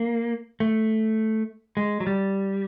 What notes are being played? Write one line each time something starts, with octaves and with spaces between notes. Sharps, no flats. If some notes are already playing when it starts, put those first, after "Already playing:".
Already playing: A#3
A3
G#3
F#3
G3